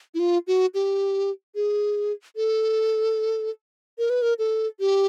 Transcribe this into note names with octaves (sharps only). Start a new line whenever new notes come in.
E4
F4
F#4
G4
G#4
A4
A#4
B4
A#4
A4
G4